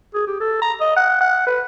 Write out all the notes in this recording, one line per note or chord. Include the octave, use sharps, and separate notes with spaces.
G#4
G4
A4
A#5
D#5
F#5
F#5
B4